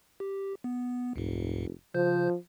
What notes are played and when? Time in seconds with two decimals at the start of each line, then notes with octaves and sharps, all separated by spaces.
0.20 G4
0.64 B3
1.16 F1 C#2 G#2
1.94 C#3 F3 C5 G6